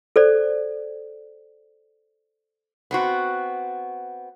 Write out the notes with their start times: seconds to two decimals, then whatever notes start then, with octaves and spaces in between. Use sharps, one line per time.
0.16 A4 C5 D5
2.91 B3 C4 F#4